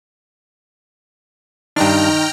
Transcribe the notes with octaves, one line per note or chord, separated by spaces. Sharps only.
G2 D#3 D4 G5 A#5 F6